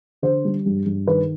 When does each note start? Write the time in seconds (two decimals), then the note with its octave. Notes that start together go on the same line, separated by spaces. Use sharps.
0.22 D3 C5
0.45 G3
0.66 G2
0.86 G2
1.07 D#3 B4